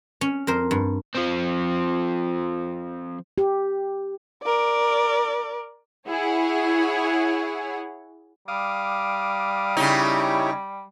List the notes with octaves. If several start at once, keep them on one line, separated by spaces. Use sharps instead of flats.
C#4
F2 A#4 C5
G2
F3 C4
G4
A#4 D5
E4 G#4 C#5 F#5
G3 F5 D6 D#6
C#3 D#4 E4 G4 C#5